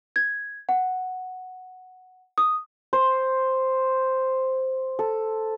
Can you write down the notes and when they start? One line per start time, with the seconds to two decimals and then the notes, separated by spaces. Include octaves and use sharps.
0.16 G#6
0.69 F#5
2.38 D#6
2.93 C5
4.99 A4